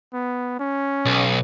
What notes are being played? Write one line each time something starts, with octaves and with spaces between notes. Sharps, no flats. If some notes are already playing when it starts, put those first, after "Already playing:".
B3
C#4
B1